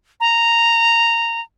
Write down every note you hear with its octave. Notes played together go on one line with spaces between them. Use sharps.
A#5